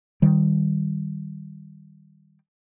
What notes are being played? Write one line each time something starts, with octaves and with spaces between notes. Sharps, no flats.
D#3 G3